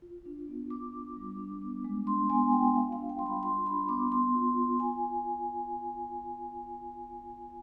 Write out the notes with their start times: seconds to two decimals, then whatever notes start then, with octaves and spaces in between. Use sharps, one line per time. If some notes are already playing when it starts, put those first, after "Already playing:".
0.02 F4
0.26 D4
0.48 B3
0.70 F4 D6
0.93 D4
1.16 G3
1.39 D4
1.62 B3
1.84 G#3
2.07 D4 C6
2.30 B3 G#5
2.52 F4 G5
2.75 F4 F5
2.92 F5
2.98 D4
3.09 G5
3.19 G3 C6
3.26 B5
3.43 F4 C6
3.66 D4 B5
3.89 B3 D6
4.12 B3 C6
4.35 F4
4.58 F4
4.80 F4 G#5